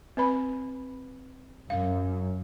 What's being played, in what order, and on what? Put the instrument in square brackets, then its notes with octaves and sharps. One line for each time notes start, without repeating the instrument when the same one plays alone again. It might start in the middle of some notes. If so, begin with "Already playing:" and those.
[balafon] C4 B4 B5
[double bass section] F#2 [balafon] F5